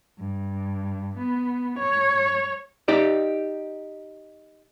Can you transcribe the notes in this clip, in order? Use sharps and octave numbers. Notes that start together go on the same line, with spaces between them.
G2
B3
C#5
D#4 G4 D5